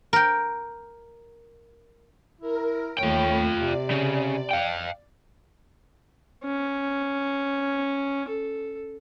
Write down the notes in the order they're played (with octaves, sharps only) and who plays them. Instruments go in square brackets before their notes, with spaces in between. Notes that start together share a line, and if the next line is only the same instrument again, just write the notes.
[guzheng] A#4 G5
[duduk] E4 [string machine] A#4
[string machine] D#2 A3 B5 [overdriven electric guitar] F4 G5 [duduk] C#5
[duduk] C3 [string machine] D5
[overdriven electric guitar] C#3
F5 G5
[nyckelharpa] C#4
A4